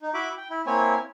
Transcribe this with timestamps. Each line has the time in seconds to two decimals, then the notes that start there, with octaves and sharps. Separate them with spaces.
0.02 D#4
0.14 E4 F#4 E5 B5 D6
0.37 G5
0.50 E4
0.66 A#3 C4 E4 C#5 G#5